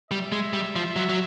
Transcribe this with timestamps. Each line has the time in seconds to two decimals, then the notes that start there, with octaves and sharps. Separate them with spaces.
0.11 G3 E5
0.32 G#3
0.53 G3
0.76 F3
0.96 F#3
1.09 F#3